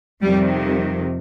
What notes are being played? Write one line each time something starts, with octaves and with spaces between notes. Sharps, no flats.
F2 C3 D#3 G3